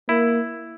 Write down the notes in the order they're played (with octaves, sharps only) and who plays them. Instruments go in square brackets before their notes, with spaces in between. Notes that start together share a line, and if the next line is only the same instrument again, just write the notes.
[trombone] A#3 [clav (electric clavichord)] E4